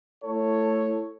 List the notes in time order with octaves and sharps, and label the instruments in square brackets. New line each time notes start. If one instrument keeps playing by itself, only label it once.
[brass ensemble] A3 E4 A4 C#5